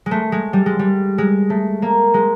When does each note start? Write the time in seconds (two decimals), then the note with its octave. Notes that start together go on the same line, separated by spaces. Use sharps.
0.06 G#3
0.11 A3
0.32 G#3
0.53 G3
0.66 G#3
0.79 G3
1.18 G#3
1.50 A3
1.82 A#3
2.14 G#3